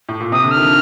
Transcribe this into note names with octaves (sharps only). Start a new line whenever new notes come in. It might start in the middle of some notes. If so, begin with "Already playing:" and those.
A2
A#2
C3 D#6
D3
F6
D#3
F3